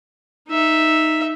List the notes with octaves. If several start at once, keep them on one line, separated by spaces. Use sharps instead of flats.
D#4 E5